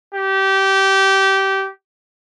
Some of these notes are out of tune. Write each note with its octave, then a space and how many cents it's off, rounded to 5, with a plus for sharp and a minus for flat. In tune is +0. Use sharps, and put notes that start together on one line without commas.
G4 -20